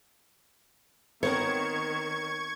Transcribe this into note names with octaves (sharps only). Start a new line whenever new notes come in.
D#3 B3 C4 A#4 C#5 C#6 G#6